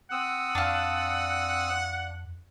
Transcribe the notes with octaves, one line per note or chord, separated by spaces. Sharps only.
C4 F#5 D#6 E6
F2 D4 F4